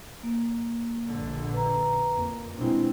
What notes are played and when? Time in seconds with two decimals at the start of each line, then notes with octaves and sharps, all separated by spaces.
0.23 A#3
1.08 A#1 D3
1.53 B4 A#5
2.13 F2 A#3
2.58 B2 G#3 C4 D4 E4